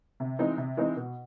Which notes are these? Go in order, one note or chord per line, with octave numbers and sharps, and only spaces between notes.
C3
E3 G#3 C4 D#4
C3
E3 G#3 C4 D#4
B2